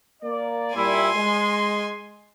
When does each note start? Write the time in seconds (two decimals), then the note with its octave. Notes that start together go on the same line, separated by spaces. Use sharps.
0.23 A#3 D5
0.75 A#2 G3 E4 G#5 C6
1.15 G#3